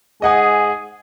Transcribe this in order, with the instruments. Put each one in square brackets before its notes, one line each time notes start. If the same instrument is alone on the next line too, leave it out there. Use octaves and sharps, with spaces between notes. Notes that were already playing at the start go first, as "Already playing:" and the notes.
[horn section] G#2 G#4 [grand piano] D#5 F#5 G#5